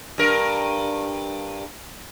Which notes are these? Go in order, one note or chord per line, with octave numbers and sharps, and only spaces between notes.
G2 A#4